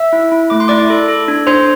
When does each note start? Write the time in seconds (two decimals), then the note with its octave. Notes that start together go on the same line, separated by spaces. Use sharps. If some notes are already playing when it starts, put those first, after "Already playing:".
Already playing: E5 E6
0.13 E4
0.32 E4
0.50 A3 D6
0.60 C6
0.68 E4 D5 D6
0.90 A4
1.08 A4
1.28 D4
1.47 D4 C5 C6